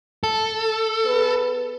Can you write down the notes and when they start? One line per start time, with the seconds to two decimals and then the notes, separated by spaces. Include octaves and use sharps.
0.24 A4
1.05 B3 G#4 B4